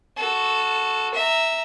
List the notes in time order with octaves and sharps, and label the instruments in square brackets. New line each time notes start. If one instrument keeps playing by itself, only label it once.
[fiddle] F#4 A4
E5 A#5